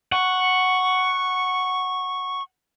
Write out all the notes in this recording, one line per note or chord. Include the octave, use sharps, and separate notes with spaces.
F#5 C#6